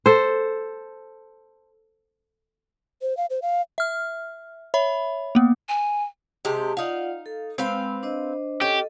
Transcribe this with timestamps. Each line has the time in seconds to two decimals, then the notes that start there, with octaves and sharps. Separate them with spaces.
0.06 A4 C5
3.02 C5
3.17 F5
3.30 C5
3.42 F5
3.78 E5 F6
4.74 C#5 E5 B5
5.35 A#3 B3
5.69 G#5
6.45 C3 G#3 G4 A5
6.77 D#4 F4 D5 F5 F#5
7.26 A4
7.58 G#3 C4 B4 F5 B5
8.03 D4 C5 D#5
8.61 C#4 G4 A4 D#5